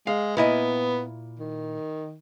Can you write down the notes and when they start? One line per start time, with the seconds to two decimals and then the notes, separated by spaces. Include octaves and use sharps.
0.07 G#3 F5
0.37 A#2 B3 E4 D#5
1.39 D#3